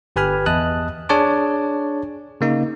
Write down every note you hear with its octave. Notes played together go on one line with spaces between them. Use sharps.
G1 G4 B4 G#5 B5 F6
E2 D#5 A5 D#6 F#6
D4 G#4 C#5 A5 D6
C#3 A#3 D#4